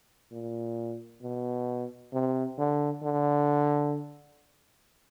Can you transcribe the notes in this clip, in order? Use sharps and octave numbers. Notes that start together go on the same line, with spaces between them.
A#2
B2
C3
D3
D3